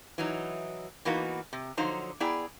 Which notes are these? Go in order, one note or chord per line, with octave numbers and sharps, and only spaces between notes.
E3 F#3 D#4
E3 A#3 B3 D#4 F#4
C3
D3 F3 F#3 D#4 C5 A#5
B3 E4 G#4 D5 G5 A#5